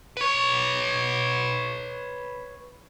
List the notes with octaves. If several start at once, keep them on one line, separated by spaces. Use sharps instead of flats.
B4 C#5